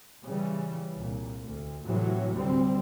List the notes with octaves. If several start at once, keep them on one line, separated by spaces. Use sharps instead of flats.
C#3 E3 G3
C2 A#2
D2
A2 C3 E3 F#3
D2 G3 C4